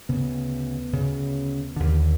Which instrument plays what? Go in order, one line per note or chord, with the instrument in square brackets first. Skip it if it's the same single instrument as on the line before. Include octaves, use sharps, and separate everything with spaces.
[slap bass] D2 C#3 B3
D2 C#3
D#2 D3